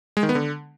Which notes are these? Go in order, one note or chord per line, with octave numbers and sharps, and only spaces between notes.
G#3
D#3
B3
D3